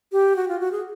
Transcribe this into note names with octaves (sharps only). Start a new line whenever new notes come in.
G4
F#4
F4
F#4
G#4